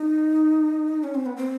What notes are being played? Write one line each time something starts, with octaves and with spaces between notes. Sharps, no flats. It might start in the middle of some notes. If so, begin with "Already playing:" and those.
Already playing: D#4
C#4
C4
B3
C4